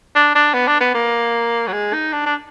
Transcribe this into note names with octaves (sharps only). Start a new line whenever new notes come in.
D4
D4
B3
D4
B3
A#3
F#3
G#3
D#4
D4
D4